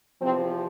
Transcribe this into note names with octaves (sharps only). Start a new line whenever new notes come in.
E2 C3 F3 C4